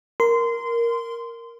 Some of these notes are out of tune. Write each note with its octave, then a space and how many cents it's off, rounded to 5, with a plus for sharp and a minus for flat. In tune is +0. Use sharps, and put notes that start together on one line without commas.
A#4 +0 C6 -20